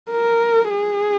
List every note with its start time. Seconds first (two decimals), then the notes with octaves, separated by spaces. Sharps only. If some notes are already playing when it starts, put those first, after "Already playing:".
0.11 A#4
0.70 G#4